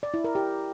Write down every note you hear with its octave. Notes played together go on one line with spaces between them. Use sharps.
D5
E4
A#4
G4